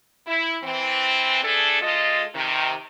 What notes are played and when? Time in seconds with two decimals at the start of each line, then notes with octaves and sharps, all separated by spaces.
0.27 E4
0.63 E3 C4
1.44 A3 D4 G#4 A4
1.82 G#3 F4 A4 D#5
2.34 C3 D#3